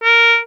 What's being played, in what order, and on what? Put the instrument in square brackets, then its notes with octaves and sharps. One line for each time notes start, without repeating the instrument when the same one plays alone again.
[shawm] A#4